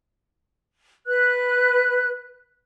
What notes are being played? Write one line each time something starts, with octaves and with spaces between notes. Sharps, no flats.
B4 F#6